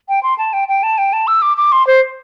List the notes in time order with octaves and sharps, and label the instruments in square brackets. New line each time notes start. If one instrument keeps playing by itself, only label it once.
[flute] G5
C6
A5
G5
G5
A5
G5
A5
E6
D6
D6
C6
C5